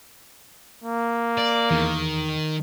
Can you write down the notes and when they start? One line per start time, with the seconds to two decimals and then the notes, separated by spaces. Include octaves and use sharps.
0.84 A#3
1.38 D5
1.71 E2 D#3